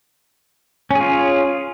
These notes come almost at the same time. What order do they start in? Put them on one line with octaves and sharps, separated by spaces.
C#4 G#4 F4